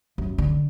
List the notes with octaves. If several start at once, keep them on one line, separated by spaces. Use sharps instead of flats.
F#2
D3